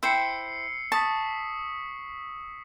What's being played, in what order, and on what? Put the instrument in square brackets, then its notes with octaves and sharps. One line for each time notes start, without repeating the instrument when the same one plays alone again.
[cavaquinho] E4 C5 G5 [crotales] E6 C7 C#7
[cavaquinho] A5 [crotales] C#6 D#6 B6